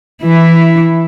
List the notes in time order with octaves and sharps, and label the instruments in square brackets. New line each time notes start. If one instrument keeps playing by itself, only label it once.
[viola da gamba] E3 E4